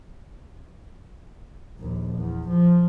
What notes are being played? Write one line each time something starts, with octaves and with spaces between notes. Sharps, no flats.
A#1 D#2
E2
F3